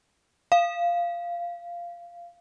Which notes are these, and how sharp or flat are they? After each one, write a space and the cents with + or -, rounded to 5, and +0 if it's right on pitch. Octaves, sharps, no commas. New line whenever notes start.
F5 -10